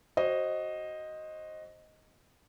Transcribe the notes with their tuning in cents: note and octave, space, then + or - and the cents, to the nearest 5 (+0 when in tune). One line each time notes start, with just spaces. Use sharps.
F#4 +15 C5 +20 D#5 +0